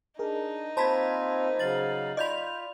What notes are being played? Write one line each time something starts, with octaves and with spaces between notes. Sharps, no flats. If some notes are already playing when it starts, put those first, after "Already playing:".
D4 D#4 G#4 A#4
A#3 C4 F4 C5 A5 B5 G#6 B6
C#3 F#3 F5 A6 F#7
F4 D5 D#5 B5 G6 F7